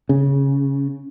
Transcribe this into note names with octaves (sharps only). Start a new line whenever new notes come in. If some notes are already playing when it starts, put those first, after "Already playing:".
C#3